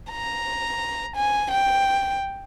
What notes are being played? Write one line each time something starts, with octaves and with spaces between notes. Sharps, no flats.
A#5
G#5
G5